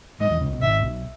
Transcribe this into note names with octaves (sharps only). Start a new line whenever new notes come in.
G#2 G#3 D#5
E2 E3
C#2 C#3
B1 B2
G#1 G#2 E5
B1 B2